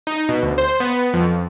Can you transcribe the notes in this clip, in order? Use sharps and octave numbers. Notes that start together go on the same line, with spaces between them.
D#4
B2
D2
C5
B3
F2
F2